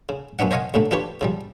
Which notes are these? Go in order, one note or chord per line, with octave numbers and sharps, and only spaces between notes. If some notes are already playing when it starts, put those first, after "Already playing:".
C#3
F#2 B3 C#4 D4 F#5
C5 C#5 D#5 F5 F#5 G#5
D#2 A2 D3 A3
D4 F4 G4 B4 C#5
C#3 F3 G3